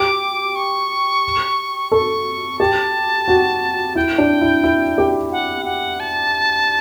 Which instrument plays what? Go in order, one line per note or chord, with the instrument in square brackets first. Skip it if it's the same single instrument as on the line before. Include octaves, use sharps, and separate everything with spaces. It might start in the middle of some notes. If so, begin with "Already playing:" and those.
Already playing: [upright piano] G4 [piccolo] D6
[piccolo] C#6
[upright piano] A4 [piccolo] C#6
[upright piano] G4 [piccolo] A5
[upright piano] F#4
[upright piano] E4 [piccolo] G5
[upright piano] D4
E4
E4
G4
[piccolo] F#5
F#5
A5